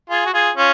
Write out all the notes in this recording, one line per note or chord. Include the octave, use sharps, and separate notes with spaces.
F4 G#4
F#4
F4 G#4
C#4 F4